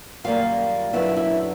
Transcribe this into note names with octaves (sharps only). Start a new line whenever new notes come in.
F#2 D#3 G3 A#3 F4 F5
F#2 D3 F#3 B3 E4 E5
E4 E5